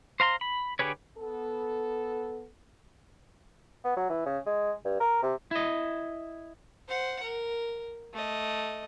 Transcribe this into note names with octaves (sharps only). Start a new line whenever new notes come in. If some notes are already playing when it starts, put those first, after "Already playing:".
C5 F5 A#5 C6
B5
D3 G4 G#4 B4 C#5
B3 A4
B3
F#3
E3
C#3
G#3
G2
A#4
C3
E4 D#5
C5 F#5
A#4
A3 D#5